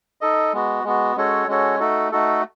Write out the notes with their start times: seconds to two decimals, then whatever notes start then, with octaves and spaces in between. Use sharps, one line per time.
0.21 D#4 A4 D#5
0.53 G#3 B3 F#4
0.84 G#3 B3 F#4
1.16 G#3 C#4 F#4 A4 C#5
1.48 G#3 C#4 F#4 A4 C#5
1.80 A3 D#4 F#4 A4
2.12 A3 D#4 F#4 A4